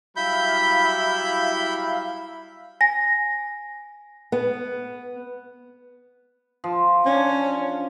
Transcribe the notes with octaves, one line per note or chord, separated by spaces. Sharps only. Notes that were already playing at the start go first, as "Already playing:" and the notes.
F#3 G3 E4 E5 F5 B5 G6
G#5 A#6
B3
F3
C#4 D4